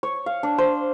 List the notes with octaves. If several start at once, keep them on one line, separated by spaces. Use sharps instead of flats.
C#5
F5
D4
C5